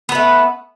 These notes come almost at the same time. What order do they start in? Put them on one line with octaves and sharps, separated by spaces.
B3 B4 A3